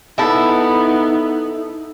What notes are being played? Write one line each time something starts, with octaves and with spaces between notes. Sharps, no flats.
B3 D#4 E4 A4